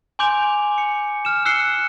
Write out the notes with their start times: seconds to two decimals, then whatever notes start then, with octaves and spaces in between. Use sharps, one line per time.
0.19 G#5 C6 D6 G6 D7 F7
0.78 C#7
1.25 F6 E7
1.45 E6 F#6 C7 C#7 G7